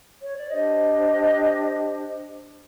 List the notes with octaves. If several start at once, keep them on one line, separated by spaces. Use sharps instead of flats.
C#5
D5
D4 G4 C5 D#5